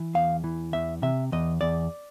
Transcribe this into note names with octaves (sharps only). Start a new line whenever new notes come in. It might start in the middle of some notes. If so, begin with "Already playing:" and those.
Already playing: E3
E2 F5
E3
E2 E5
C3 E5
E2 D#5
E2 D5